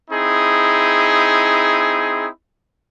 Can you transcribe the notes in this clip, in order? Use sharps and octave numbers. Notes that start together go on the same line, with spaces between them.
C4 D#4 E4 G#4